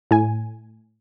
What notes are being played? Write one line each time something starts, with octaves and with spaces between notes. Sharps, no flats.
A2 G#5